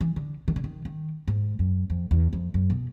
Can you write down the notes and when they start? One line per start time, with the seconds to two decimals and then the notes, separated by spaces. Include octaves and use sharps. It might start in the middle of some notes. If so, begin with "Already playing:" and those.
0.01 E3
0.16 D3
0.48 D#3
0.56 D3
0.64 D#3
0.85 D#3
1.28 G#2
1.59 F#2
1.90 F2
2.11 E2
2.33 F2
2.54 F#2
2.70 B2